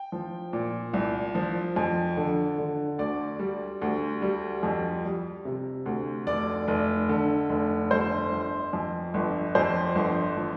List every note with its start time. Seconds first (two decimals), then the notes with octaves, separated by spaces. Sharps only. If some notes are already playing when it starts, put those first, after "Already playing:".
Already playing: G5
0.12 F3
0.53 A#2
0.94 C2
1.35 F3
1.76 F2
2.17 D3
2.58 D3
2.98 D2 D5
3.39 G3
3.82 D2
4.22 G3
4.63 F2
5.04 G3
5.45 C3
5.86 D2
6.27 F1 D5
6.68 F1
7.09 D3
7.49 F1
7.91 G1 C5
8.31 G1
8.73 F2
9.14 G1
9.55 F2 C5
9.95 G1
10.37 F3